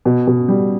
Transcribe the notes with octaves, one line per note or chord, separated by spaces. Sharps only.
B2
B2
G3